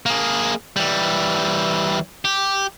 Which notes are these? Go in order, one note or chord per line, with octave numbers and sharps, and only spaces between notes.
A#3 G#4
E3 G3
G4